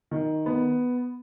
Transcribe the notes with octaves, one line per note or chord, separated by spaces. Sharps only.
D#3
B3